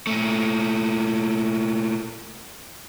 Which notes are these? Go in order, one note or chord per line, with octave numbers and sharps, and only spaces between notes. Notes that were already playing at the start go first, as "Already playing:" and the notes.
A#2 A3